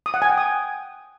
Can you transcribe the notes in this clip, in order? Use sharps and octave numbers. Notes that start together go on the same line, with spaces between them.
D#6
F#5
G#5
G5
D#6